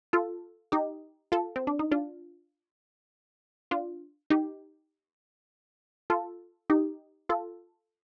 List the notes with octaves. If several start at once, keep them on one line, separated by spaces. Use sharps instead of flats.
F4 A4
D#4 G4
F4 A4
C4
D4
D#4
D4 F4
D4 F4
D#4 G4
F4 A4
D#4 G4
F4 A4